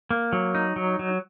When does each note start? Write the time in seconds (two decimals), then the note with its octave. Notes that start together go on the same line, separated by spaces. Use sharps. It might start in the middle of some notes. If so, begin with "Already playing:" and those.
0.11 A#3
0.33 F#3
0.55 D#4
0.76 F#3
0.99 F#3